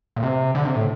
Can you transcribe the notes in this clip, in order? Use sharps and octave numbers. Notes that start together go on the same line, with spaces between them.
A#2
C3
D3
C3
A2